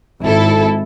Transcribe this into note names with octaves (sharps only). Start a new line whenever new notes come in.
G#1 E4 A4